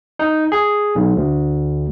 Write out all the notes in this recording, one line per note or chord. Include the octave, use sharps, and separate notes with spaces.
D#4
G#4
B1
D2